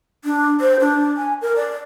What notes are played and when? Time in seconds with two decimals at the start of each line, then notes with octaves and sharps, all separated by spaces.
0.25 D4
0.60 C5
0.80 D4
1.17 G#5
1.42 A#4
1.56 D5